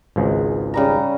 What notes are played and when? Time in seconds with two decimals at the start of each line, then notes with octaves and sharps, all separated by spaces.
0.16 G#1 C#2 G#2
0.74 C#3 G3 A#5